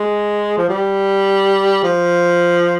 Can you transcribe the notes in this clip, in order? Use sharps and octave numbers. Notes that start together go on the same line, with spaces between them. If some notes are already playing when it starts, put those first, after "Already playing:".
Already playing: G#3
F3
G3
F3